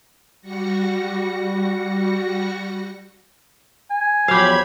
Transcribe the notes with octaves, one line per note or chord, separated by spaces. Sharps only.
G3 F#4 A#6 C#7
G#5
E2 F3 F#3 G4 C5 F5 B5 G#6